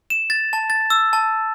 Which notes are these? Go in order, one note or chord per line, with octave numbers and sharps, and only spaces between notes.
E7
A6
A5
A6
E6
A5